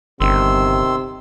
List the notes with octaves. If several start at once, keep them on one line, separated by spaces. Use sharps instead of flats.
G1 C3 D#3 C6 E6